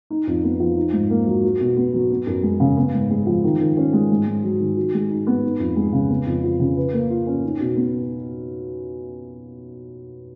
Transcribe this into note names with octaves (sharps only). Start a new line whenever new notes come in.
D#4
F2
B3
F3
D#4
G#2
A#3
F#3
F#4
B2
B3
F#3
B3
F#2
G#3
C#3
B3
G#2
G#3
F3
D#3
D#3
C#4
G#3
G#2
G#2
F#3
D#3
F#4
G#3
D#4
B3
D#4
F2
G#3
C#3
B3
F2
F3
C#3
B4
A#3
F4
C#4
D#4
B2
B3